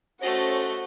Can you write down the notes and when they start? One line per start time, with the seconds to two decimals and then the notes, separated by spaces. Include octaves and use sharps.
0.22 A3 C#4 F#4 A4 C5 D#5